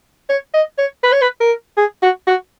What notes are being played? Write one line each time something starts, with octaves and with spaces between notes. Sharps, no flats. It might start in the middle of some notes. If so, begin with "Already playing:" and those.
C#5
D#5
C#5
B4
C#5
B4
A#4
G#4
F#4
F#4